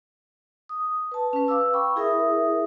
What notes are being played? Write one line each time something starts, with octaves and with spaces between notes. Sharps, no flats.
D#6
B4 A5
C#4 B4
B4 F5 D6 E6
G5 B5 C#6
E4 G#4 A#4 E5 D#6